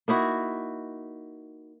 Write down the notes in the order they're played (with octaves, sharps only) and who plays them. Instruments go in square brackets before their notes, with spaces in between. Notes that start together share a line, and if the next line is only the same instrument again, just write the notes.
[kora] A#3 D#4 E4 F#4